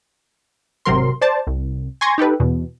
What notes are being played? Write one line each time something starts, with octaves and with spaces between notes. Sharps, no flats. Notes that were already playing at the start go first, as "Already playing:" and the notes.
G#1 C3 F#3 A#4 C6
C5 D5 A5
C2
G#5 C6 C#6 G#6 A#6
D#4 G4 A4 B4
E2 B2